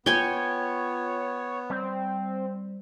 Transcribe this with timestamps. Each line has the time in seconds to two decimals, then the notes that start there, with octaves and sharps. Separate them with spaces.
0.06 B3 F4 C#5 G5 G#5
1.70 G3 C4